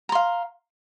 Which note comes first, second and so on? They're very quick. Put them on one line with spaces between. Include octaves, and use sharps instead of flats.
A#5 C6 F5